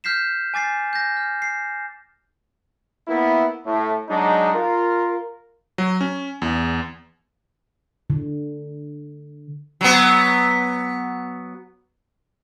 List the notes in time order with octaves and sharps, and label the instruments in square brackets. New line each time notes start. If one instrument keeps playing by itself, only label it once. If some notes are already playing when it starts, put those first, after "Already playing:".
[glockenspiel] F6 G6 B6 C7 E7
G#5 D6 A6 C7
G6 A#6
F6
C7
[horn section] A#3 B3 E4
A2
F#3 G#3 D4 D#4
F4 A#4
[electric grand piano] F#3
C#4
E2
[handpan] D3
[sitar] F#3 B3